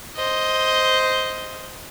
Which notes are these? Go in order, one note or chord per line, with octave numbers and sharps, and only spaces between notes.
C5 D#5